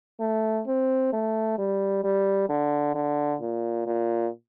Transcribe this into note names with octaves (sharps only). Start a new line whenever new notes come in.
A3
C4
A3
G3
G3
D3
D3
A#2
A#2